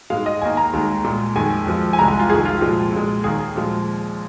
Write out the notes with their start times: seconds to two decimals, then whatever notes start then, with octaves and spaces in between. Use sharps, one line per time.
0.10 G#2 G#3 F5
0.26 D#5
0.41 D#2 D#3 A#3 G#5
0.57 A#5
0.73 D#2 D#3 G#3
1.04 A#2 G#3
1.35 F2 D#3 G#3 G#5
1.67 F2 F3 G#3
1.93 G#5
1.98 C2 C3 G#3 A#5
2.08 G#5
2.19 F4
2.30 F2 D#3 G#3 G#4
2.45 F4
2.61 A#2 F3 G#3
2.93 A#2 G#3
3.24 D#2 D#3 A#3 G#4
3.56 A#2 F3 G#3